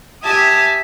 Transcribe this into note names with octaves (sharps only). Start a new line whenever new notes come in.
G4 E5 G#5 A5 D#6